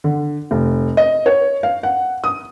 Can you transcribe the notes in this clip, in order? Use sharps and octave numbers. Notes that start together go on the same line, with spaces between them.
D3
F1
D#5
C#5
F5
F#5
D#6